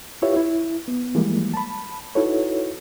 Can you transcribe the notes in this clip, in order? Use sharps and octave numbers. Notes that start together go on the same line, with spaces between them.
E4 F4 G4 B4 C#5 E5
E4
B3
E3 F3 G3 G#3 A#3
A5 B5
D#4 E4 F#4 A4 B4 C#5